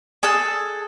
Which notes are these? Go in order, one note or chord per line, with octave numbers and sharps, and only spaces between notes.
G#4 A4 E6 F#6